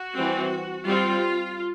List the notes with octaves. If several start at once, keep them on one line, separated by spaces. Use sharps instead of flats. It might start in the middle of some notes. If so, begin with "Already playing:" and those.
Already playing: F#4
E3 G3 C4
G3 C4 F4